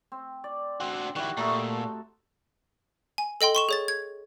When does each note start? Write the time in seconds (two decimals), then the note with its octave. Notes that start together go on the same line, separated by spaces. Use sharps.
0.12 C4
0.44 D5
0.80 C4 D4 F#4
1.16 D#3 G3 E4 F#4
1.37 A#2 A3 D#4 A4
3.18 G#5
3.41 A4 D#5 G5 C6
3.55 C6 C#6 E7
3.69 G#4 C#5 A6
3.88 G#6